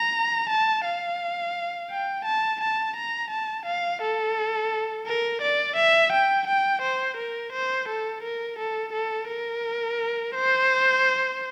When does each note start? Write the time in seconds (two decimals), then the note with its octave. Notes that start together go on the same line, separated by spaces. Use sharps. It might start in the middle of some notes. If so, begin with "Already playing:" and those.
Already playing: A#5
0.50 A5
0.85 F5
1.90 G5
2.25 A5
2.61 A5
2.96 A#5
3.30 A5
3.65 F5
4.02 A4
5.06 A#4
5.42 D5
5.77 E5
6.12 G5
6.47 G5
6.82 C5
7.17 A#4
7.53 C5
7.88 A4
8.23 A#4
8.59 A4
8.93 A4
9.28 A#4
10.35 C5